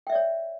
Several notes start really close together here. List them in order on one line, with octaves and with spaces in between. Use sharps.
G5 E5 D5 C#5